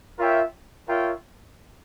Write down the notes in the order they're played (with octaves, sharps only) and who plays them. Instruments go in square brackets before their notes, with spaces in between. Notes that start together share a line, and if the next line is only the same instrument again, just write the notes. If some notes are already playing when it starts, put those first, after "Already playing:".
[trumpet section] F4 A#4 C#5 E5 G5
F4 A#4 C#5 E5 G5